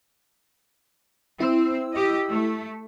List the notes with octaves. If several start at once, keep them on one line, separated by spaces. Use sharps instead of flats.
C4 E4 E6
G4 D#5
A3